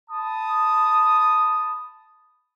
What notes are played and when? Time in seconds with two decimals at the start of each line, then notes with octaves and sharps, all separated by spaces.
0.10 A5 B5 D#6